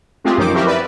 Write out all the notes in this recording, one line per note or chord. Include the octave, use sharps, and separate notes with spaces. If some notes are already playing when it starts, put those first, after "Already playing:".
G#3 A3 C4 F4 G4 G#4
F#2 D#3 F3 D#4 C5 D6
F3 C4 E4 F#4 G4 A#4
B4 D5 E5